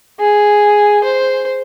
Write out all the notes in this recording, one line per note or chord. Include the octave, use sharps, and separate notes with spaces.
G#4
C5